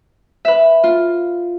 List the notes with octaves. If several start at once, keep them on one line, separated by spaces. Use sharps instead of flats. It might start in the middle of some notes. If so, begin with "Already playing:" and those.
B4 E5
F4